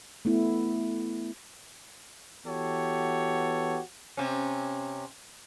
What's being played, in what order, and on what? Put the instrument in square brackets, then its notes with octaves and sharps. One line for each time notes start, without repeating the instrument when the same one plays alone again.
[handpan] A3 B3 E4
[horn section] E3 B3 F#4 G4 A4 C#5
[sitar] C3 C#4